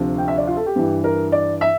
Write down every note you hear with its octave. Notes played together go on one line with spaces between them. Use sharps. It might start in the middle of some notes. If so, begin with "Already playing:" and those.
Already playing: D2 C3 F3
G5
E5
D5
F4
A4
G4
G2 E3
A#4
D5
E5